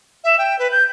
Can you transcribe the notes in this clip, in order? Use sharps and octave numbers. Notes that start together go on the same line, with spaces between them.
E5
G5
B4
G6